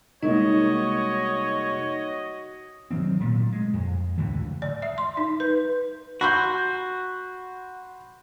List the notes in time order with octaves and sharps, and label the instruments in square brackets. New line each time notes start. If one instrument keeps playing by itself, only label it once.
[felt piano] C2 G#3 A#3 [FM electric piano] D#4 [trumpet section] F#4 D#5 [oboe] C#5
[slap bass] D#3 F#3 G#3 C4
A#2 A3
G#3
F2
C#2 A2 D3 E3
[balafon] D5
E5
C6
D#4
B4
[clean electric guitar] F#4 [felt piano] B5 C6 G6